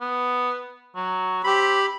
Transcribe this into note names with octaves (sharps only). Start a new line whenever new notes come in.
B3
F#3
C4 G4 B5